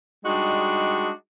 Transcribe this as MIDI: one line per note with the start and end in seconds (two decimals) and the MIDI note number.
0.25 1.09 55
0.25 1.09 56
0.25 1.09 62
0.25 1.09 63
0.25 1.09 66